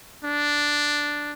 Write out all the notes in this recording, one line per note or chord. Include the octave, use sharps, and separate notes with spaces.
D4